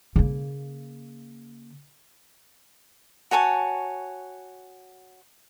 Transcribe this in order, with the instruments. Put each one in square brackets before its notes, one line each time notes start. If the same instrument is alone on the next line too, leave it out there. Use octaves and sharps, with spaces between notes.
[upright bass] C#3 A#3
[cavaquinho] F#4 C#5 G#5 A5